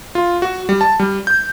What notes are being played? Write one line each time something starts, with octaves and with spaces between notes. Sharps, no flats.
F4
F#4
G3
A5
G3
G6